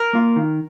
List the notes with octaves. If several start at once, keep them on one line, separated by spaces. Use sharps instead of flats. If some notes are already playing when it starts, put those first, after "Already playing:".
Already playing: A#4
A#3 F4
D#3